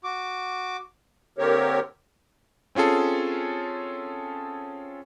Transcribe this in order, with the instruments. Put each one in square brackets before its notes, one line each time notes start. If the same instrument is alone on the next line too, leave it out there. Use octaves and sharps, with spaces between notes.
[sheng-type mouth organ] F#4 D6
[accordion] D3 A#3 C4 G4 A#4 C#5
[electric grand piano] C4 C#4 F4 G#4 A4